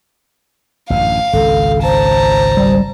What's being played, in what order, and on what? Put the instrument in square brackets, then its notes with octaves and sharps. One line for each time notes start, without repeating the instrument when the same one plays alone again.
[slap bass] A1 F#2 D3 [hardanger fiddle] F5
[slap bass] G#1 C#2 [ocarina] A4
[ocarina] C5 [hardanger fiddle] A5 A#5
[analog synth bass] G3